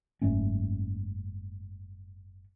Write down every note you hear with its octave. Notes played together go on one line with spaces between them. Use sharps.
F#1 G#2 A3 C#4